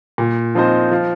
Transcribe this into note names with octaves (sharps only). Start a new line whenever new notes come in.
A#2
F3 C4 D#4 C5
F3